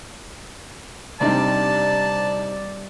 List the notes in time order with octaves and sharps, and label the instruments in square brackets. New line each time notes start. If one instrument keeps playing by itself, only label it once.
[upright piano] C3 D4 D#4 [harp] G3 C4 [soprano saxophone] D5 [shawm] A5